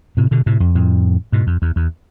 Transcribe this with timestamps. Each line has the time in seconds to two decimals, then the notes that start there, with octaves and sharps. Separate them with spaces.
0.17 A2 C3
0.31 B2 D3
0.46 A2 C3
0.60 F2
0.75 F2 A2
1.32 G#2 B2
1.47 F2
1.62 E2
1.76 E2